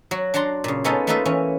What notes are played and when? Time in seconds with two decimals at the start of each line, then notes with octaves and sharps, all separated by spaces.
0.11 F#3 F#4
0.34 D4 F#5 A5 A#5 C6
0.64 A#2 C#3
0.84 G#3 B3 C#4 D#4 F4 A4
1.07 A3 A#3 D#4 F4 B4 E5
1.25 E3 C#4